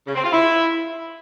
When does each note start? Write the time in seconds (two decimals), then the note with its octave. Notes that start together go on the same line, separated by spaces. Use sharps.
0.07 C#3
0.15 C4
0.24 F4
0.33 E4